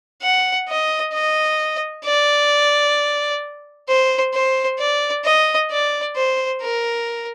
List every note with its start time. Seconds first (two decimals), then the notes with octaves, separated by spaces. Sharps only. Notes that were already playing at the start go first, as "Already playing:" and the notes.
0.23 F#5
0.69 D#5
1.14 D#5
2.05 D5
3.88 C5
4.34 C5
4.79 D5
5.25 D#5
5.71 D5
6.17 C5
6.62 A#4